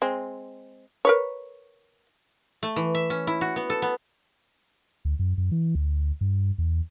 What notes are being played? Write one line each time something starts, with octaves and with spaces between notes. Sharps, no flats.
G#3 C4
A#4 B4 C#5
A3
E3
E5
C#4
E4
F#4
B3
A4
B3
D2
F#2
F#2
E3
D2
G2
E2